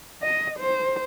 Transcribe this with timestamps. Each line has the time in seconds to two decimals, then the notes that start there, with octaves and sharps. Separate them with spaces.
0.22 D#5
0.59 C5